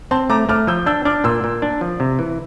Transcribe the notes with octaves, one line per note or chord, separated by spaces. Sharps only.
C4 A5 C6
A3 A#5 D6
A3 D6 F6
F3 E6 G6
D4 E6 G6
D4 D6 F6
A#2 C6 E6
A#2
D4
F3
C3
E3